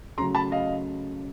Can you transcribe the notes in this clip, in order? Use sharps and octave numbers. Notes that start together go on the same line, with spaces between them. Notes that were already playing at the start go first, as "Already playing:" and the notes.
C#3 F#3 A3 A#5 C6
A5 B5
D#5 F5